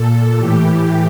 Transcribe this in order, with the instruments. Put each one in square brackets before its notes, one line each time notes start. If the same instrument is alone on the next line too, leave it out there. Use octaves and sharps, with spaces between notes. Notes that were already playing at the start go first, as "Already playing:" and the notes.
Already playing: [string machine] A#2 A4
A2 E3 G4